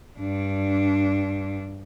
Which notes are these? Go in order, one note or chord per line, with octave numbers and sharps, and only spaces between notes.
G2 D4